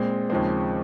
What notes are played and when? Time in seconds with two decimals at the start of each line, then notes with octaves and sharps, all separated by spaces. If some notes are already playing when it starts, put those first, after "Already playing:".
Already playing: A#2 G#3 C4
0.30 D#2 C#3 F3 G#3 C4